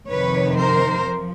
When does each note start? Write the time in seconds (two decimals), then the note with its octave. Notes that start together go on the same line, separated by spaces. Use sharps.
0.08 F2 C3 D#3 B4 C#5
0.57 A#4 C5
1.04 F3